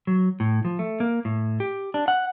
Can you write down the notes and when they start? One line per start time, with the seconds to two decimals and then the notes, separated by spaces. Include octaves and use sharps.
0.07 F#3
0.40 A2
0.65 F3
0.79 A3
1.00 A#3
1.25 A2
1.60 G4
1.94 D4
2.08 F#5